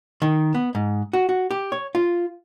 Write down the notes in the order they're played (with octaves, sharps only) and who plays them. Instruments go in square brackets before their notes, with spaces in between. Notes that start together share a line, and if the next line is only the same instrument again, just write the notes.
[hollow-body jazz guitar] D#3
B3
G#2
F#4
F#4
G4
C#5
F4